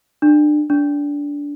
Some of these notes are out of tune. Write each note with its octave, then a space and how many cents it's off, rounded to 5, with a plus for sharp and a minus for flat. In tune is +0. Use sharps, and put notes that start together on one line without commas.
D4 +30
D4 -20